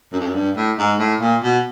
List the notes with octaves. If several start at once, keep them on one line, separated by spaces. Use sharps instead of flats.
F#2
F2
F#2
G2
A2
G#2
A2
A#2
B2